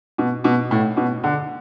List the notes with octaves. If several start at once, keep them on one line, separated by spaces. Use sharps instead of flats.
B2
B2
A2
B2
D3